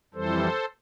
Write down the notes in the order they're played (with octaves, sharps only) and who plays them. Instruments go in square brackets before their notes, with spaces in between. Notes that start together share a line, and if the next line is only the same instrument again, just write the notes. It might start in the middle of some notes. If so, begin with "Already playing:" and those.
[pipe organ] F2 E3 G3 A4 C5